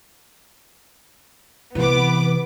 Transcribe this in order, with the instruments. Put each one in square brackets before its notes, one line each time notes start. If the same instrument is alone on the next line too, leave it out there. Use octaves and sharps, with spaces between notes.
[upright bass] C3 E3 [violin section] B3 B4 D6